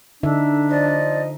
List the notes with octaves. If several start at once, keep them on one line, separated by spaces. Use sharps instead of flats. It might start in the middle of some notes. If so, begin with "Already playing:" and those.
D3 D4 D#4 E5
F3 D5 D#5